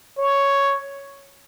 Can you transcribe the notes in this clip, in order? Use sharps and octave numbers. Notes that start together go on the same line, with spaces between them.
C#5